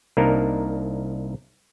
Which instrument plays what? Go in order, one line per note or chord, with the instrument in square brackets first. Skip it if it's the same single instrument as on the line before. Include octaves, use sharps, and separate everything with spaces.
[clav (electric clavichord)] C2 A#3 D4 D#4 A#4